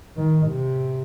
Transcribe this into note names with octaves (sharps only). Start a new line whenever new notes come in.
D#3
C3